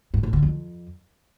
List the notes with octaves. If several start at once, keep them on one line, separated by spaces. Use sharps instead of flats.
G#2
A2
D3
F2